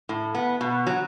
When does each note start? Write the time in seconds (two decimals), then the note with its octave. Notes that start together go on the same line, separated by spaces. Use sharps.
0.09 A2
0.35 B3
0.61 B2
0.87 F#3